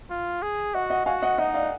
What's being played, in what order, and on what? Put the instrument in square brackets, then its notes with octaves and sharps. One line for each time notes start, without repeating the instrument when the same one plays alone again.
[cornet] F4
G#4
[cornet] F#4 [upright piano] D#5 F#5
[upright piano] D#5 F#5
[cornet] F#4 [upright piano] F5 G#5
[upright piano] D#5 F#5
[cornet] D#4 [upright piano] D#5 F#5
[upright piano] D5 F5
F#5